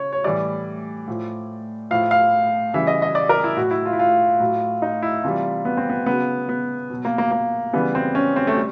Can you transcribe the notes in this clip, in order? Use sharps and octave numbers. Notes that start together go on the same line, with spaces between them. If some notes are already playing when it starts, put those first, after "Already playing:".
Already playing: C#3 C#5
C#5
A2 E3 G3 D5
A2 F3
A2 F3 F5
F5
C#3 E3 G3 E5
D#5
D#5
D5
A#4
E4
A2 F#3 F#4
E4
F4
E4
F4
A2 F#3
D#4
E4
C3 E3 G3 F4
B3
C4
B3
C#3 F#3 B3
B3
B2 F#3
A#3
A#3
A#3
C#3 E3 G3 B3
C4
C#4
C4
A3
G3